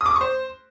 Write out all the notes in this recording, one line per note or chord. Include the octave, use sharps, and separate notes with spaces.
D#6
D6
D#6
C#6
C5